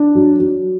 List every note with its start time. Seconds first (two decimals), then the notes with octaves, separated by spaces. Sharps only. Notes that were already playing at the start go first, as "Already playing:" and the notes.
Already playing: D4
0.15 F#3
0.40 F#3